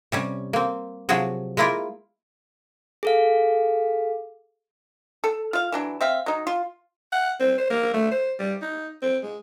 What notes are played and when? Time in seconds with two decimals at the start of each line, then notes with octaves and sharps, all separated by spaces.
0.12 C3 G3 C#4
0.53 A#3 C4
1.09 C3 F3 F#3 F#4 G#4
1.57 G#3 A#3 E4 F4 A#4
3.03 G#4 A4 F5
5.24 A4
5.53 F4 F5
5.72 E3 F#3 D4
6.01 C4 E5 F5
6.26 F#3 D#4
6.47 F4
7.12 F#5
7.40 C4
7.58 C5
7.70 A#3
7.93 A3
8.11 C5
8.39 G3
8.61 D#4
9.02 C4
9.23 G#3